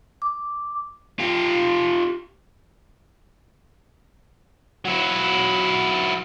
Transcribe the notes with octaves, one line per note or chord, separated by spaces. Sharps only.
D6
F4 G4
F#3 E4